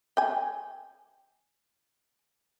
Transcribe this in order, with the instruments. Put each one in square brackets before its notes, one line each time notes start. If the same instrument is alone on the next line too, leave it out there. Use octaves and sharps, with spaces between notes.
[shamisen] G5 G#5